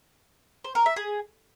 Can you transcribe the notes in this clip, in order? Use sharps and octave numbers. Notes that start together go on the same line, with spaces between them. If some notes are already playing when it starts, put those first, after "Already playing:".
C5
A#4
E5
G#4